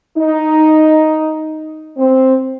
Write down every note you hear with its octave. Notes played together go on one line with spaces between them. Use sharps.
D#4
C4